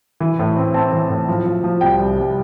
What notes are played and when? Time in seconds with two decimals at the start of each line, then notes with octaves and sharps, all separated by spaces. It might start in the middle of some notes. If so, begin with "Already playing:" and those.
0.20 E3
0.39 A2
0.57 C4
0.74 C4 A5
0.92 E3
1.10 A2
1.28 F3
1.46 F3
1.64 F3
1.81 C2 G5
2.00 C2
2.17 C2